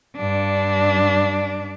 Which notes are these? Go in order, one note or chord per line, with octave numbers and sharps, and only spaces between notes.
G2 D4